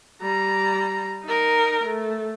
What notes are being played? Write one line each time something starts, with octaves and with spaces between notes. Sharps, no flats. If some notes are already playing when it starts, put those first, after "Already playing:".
G3 A#5
D#4 A#4
A3